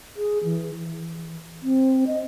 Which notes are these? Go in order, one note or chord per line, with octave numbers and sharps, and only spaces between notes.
G#4
E3
E3
C4
D#5